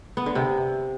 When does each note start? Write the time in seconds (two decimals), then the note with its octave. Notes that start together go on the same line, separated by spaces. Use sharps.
0.17 B3
0.26 D3
0.35 C3